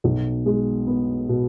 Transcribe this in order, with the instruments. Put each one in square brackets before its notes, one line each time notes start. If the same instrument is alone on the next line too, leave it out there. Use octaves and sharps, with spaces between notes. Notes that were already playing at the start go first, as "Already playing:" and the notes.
[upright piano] B1
G#3
B3
B2